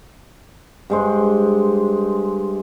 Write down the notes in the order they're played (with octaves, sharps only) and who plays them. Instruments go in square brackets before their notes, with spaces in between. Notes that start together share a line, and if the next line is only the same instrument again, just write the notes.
[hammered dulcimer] G2 G#3 C5